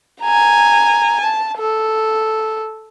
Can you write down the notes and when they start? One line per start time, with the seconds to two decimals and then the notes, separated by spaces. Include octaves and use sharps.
0.22 G#5 A#5
1.20 A5
1.58 A4